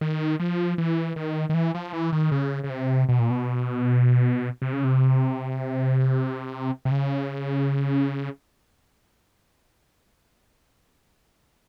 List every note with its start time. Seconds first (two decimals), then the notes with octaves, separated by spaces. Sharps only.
0.01 D#3
0.40 F3
0.78 E3
1.16 D#3
1.49 D#3
1.54 E3
1.75 F3
1.93 E3
2.12 D#3
2.31 C#3
2.64 C#3
2.70 C3
3.09 B2
3.19 A#2
3.30 B2
4.62 C3
4.73 C#3
4.84 C3
6.85 C3
6.91 C#3